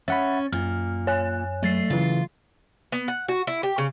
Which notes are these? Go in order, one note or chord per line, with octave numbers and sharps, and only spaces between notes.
C#4 E5 F#5 B5 A6
F#2 A#2 F6
C#5 G#5 F#6
F#3 A3 A6 C7
C#3 E3 F4
B3
F#5
F#4
E4
G4
C#3